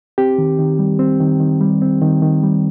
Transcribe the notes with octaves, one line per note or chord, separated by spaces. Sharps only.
C4 G4
D#3
D#3
G3
C4
D#3
D#3
G3
C4
D#3
D#3
G3